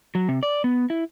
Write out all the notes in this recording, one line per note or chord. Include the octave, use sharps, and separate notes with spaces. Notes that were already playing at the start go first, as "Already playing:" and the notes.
F#3
C3
D5
B3
E4